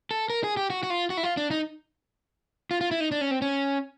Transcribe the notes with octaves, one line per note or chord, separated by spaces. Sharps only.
A4
A#4
G#4
G4
F#4
F#4
F4
F#4
E4
F4
D4
D#4
F4
F4
E4
D#4
D4
C#4
C4
C#4